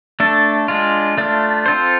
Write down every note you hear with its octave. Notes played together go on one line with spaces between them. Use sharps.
A3 D4 A4
G#3 D4 F4
A3 D4 F4
C4 F4 A4 C5